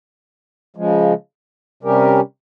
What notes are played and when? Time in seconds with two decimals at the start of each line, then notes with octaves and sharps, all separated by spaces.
0.76 C#3 F3 G#3
1.83 C3 G3 C#4 G4 A#4